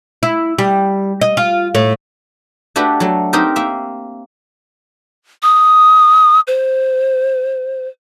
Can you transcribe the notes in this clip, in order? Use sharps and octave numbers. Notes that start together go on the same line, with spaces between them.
E4
G3
D#5
F4
A2
A3 D4 F#4 G4 B4
F#3 A3
C4 D#4 G4 A#4 C5
A#3 E5
D#6
C5